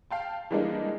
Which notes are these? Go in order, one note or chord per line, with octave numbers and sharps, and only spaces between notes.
F5 G5 A5
E3 G3 G#3 A#3 D4 D#4